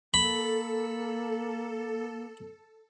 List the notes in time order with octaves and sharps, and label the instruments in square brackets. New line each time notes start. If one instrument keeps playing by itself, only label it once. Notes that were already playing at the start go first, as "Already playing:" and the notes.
[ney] A#3 [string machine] A4 [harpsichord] B5